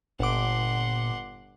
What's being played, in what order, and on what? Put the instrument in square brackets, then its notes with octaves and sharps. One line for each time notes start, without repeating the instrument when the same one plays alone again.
[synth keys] G1 D6 [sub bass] A#2 [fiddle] F#5 C6